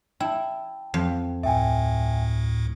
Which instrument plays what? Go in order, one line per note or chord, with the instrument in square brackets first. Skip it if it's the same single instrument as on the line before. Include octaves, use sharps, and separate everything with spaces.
[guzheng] E4 [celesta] G5 A5
[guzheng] F2
[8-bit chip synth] D2 A2 [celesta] E5 G5 G#5